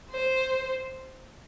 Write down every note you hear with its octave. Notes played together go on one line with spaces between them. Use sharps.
C5